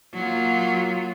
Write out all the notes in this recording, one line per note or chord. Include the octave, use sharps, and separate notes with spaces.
F#3 A#3 F4